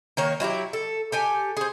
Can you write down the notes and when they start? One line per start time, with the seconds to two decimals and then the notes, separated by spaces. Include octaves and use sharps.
0.17 D#3 A#3 C#5
0.40 F#3 E4 F4 G4
0.73 A4
1.12 G4 A4 G#5
1.57 G#4 C5